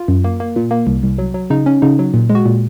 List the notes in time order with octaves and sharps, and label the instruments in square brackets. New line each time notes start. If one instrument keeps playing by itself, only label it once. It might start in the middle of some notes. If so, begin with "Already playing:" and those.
Already playing: [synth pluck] F4
F#2
A#3
A#3
A#2
A#3
C2
C2
F#3
F#3
C#3 D#4
C#4
C#3 D#4
F#3
A#2
G#3
F#4
A#2